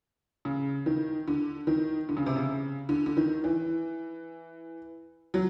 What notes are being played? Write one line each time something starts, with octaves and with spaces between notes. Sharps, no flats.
C#3
D#3
D3
D#3
D3
C#3
C3
C#3
D3
D3
D#3
E3
F#3